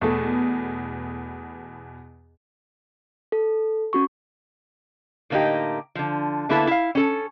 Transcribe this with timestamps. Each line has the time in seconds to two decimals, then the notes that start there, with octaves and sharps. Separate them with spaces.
0.01 E2 B2 A3 A4
3.32 A4
3.93 C#4 F#4 C#6
5.30 A2 D3 A#3 D4 D#4 G4
5.95 D3 F3
6.49 D3 A#3 B3 E4 A4 B4
6.67 E4 F5
6.95 C#4 A4